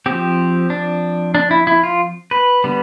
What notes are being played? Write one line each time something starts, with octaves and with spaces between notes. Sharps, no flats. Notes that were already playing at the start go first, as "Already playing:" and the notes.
F3 C4 G4
D4
D4
E4
E4
F4
B4
D3 G3 B3